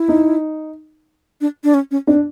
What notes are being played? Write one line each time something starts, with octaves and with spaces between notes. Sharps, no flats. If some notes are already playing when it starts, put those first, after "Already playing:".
Already playing: E4
D#4
D4
D4
C#4
C#4
C4 D4